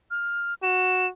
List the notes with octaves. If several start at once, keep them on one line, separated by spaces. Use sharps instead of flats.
F6
F#4 E7